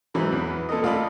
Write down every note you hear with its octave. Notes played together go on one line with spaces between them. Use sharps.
G#2 E3 F#3 B5
E2 B4
A#2 A4 A#4 D#5
D2 F4 A4 D5 D#5 B5